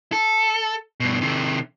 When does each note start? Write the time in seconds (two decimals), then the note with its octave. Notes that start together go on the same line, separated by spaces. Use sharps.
0.12 A4
1.00 G2 B2
1.21 C3 D#3